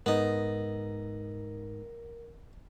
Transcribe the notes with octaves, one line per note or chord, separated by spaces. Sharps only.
G#2 G#3 B3 D#4 A#4 D#5 A#6